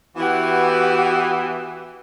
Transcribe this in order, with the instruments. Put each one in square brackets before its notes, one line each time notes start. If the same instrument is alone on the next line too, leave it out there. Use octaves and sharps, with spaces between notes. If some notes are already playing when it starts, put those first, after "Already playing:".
[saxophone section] E3 B3 [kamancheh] F#4 G4